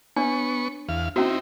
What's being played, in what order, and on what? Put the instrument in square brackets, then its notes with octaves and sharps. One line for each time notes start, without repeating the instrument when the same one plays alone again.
[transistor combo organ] B3 C#6 [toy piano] D4 C#5
[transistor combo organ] E2 F5
[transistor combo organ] C4 D#4 E4 [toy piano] C#4 F#4